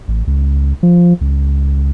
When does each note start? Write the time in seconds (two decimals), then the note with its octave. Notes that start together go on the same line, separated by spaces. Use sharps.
0.08 A1
0.27 C#2
0.83 F3
1.21 C#2